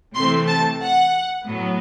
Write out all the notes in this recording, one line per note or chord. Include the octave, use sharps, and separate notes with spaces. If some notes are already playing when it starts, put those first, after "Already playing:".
C3 E3 A3 C4 C6
A5
F#5
A2 F#3 B3